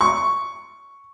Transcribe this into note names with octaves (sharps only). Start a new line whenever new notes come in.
C#6